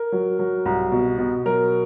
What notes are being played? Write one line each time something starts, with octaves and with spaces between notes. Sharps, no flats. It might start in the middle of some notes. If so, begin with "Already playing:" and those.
Already playing: A#4
F#3
F#3
C2
B2
B2
F#3 A#4